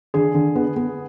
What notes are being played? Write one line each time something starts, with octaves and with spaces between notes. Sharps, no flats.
D3 G#4
D3
B3
B3